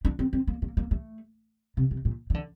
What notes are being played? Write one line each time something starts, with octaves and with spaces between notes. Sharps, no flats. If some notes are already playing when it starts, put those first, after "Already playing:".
D4
C4
C4
A#3
A#3
A#3
A3
C3
C3
A#2
D#3
D3